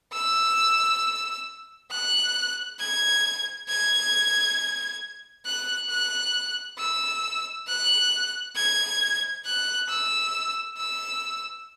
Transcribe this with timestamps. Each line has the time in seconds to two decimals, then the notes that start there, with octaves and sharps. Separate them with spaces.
0.13 E6
1.91 F#6
2.79 G#6
3.68 G#6
5.45 F#6
5.90 F#6
6.78 E6
7.67 F#6
8.56 G#6
9.45 F#6
9.89 E6
10.77 E6